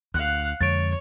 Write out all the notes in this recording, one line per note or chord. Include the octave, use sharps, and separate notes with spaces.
D2 F5 F#5 F#6
F2 D3 G#3 C#5 A6 D7